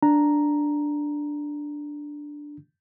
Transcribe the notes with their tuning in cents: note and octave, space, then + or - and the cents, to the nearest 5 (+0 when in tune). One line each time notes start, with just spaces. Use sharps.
D4 +0 A#5 +0